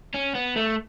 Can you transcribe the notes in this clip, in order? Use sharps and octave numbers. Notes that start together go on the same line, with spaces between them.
C#4
B3
A3